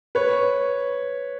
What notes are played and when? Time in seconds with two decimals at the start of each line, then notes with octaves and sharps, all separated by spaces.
0.15 B4 C#5